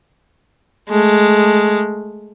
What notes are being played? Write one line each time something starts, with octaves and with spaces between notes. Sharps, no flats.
G#3 A3